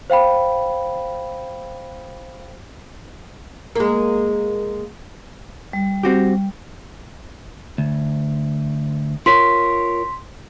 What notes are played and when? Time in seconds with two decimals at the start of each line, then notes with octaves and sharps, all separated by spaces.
0.10 C5 F5 G5 B5
3.76 G#3 A#3
5.73 G3
6.03 C4 F#4 G4
7.78 D2
9.26 F4 A#4 C#5 C6 B6